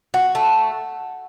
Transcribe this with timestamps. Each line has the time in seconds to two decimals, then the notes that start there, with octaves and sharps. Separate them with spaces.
0.14 F#4 F#5
0.35 A3